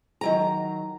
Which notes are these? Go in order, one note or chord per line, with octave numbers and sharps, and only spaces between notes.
D#3 F#3 A#5